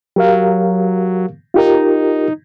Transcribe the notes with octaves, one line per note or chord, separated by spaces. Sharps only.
F#3 G4 A#4 F5
D#4 F4 G4 A#4